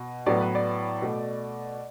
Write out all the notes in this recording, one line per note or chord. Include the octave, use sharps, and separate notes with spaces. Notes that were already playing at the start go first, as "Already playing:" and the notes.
Already playing: B2
A2 F#3 B3 D5
B4
D5
B2 A3